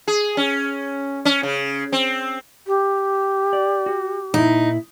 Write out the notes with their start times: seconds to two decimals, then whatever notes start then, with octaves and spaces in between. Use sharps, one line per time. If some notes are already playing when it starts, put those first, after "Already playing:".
0.08 G#4
0.37 C#4
1.25 C#4
1.43 C#3
1.92 C4
2.67 G4
3.53 D5
3.86 F#4
4.34 A#2 D#4 E4